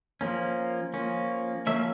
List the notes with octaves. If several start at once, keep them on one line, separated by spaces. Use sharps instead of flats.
F3 A#3 C#4
F3 A#3 C#4
F3 A#3 C#4 E5